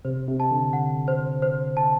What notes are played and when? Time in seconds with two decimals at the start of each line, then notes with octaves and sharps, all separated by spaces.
0.05 C3 C5
0.27 C3
0.40 A5
0.51 D3
0.73 F#5
1.08 C5
1.42 C5
1.77 A5